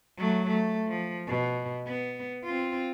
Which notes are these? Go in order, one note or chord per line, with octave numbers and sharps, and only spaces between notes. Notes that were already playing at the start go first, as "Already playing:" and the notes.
F#3 A3
A3
F3
B2
B3
C4 F4